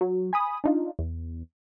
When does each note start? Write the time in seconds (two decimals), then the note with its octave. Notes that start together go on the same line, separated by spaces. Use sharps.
0.01 F#3
0.33 G#5 B5 D#6
0.64 D4 D#4 F4
0.99 E2